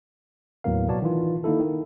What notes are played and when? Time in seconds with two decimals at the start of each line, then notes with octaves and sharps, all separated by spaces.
0.64 D#2 A2 F#3 B3 A#4 F5
0.88 B2 F#3 B3 C#5 D5 A5
1.02 D#3 E3 F4
1.44 D#3 A#3 D#4 E4 A4
1.60 D#3